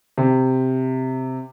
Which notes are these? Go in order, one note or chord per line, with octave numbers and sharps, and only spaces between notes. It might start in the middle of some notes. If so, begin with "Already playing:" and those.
C3